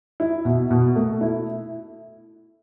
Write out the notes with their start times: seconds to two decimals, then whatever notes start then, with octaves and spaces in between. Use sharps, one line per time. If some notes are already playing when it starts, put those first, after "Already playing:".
0.20 E4
0.45 B2
0.71 B2
0.96 A3
1.21 E4